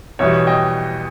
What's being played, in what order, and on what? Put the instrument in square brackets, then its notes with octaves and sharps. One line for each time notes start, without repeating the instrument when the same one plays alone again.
[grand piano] E2 B2 G3 C#5 E5
D#5 G5